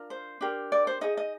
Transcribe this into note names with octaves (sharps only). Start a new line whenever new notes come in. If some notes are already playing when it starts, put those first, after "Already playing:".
Already playing: D4 F4 A#4
C5
D4 G4 A#4
D5
C5
D#4 G#4 D#5
D#5